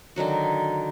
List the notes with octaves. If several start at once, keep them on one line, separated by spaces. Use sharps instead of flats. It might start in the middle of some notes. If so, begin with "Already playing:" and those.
D3 D#3 F#3 F#4